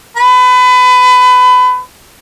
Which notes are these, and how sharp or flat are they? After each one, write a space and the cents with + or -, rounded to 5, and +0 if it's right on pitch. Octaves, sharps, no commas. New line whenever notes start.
B4 +25